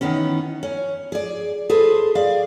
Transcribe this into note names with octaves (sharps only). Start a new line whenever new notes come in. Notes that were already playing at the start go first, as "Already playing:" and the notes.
D#3 E3 B3 C#4
C#4
G#4 D5
G#4 A4 B4 C5
G#4 D5 F5